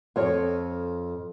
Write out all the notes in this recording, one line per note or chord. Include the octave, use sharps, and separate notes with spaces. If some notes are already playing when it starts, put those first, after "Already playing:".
F2 C#5